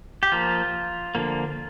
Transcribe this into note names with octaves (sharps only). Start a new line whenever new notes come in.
G4
F3 A#3 F4
D3 F3 A#3